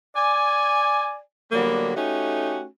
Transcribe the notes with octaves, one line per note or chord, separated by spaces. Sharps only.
D5 G#5
D3 F#3 G3 A#3 B3
A3 C#4 D#4 F#4 G4